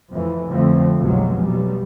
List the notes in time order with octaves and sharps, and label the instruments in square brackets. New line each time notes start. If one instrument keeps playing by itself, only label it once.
[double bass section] F2 A2 E3
F2 D3 F3 A3 C4
F1 B1 F2 F#3 G#3
B1 G3